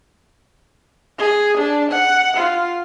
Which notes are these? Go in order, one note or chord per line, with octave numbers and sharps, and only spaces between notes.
G#4
D4
F#5
F4